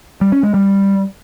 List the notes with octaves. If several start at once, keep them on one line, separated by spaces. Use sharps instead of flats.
G3
C#4
G#3
G3